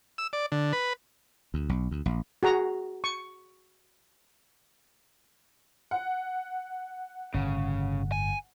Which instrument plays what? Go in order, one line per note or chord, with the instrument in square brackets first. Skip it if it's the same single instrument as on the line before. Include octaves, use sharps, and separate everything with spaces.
[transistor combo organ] E6
D5
D3
B4
[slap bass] D2
B1
D2
A#1
[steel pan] F#4 G#4 A#5
C#6
[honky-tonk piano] F#5
[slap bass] G1 A2 [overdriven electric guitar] C#3
[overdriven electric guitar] G#5